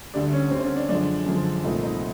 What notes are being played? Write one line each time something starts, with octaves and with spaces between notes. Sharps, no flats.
D2 D3 G3 D4
C#4
D2 D3 G3 C4
C#4
D4
F#2 D3 F3 G#3 D4
F#2 D3 F3 G#3
C2 A#2 F3 A3 D#4
D#4